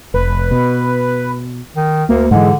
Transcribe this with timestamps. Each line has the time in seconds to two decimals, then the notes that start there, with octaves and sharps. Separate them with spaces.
0.14 F1 B4
0.51 B2
1.76 D#3
2.09 D2 A#3
2.31 G#2 D3 E3 G#3